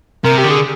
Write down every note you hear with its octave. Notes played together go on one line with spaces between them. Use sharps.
C3 A#4
G4
D3
G#4